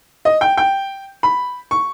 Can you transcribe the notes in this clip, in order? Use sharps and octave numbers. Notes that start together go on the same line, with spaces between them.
D#5
G5
G5
B5
C#6